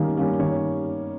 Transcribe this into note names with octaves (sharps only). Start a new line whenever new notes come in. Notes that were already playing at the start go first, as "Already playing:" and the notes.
Already playing: D#3 G3 A#3 C#4
G3 A#3 C#4
D#3 C#5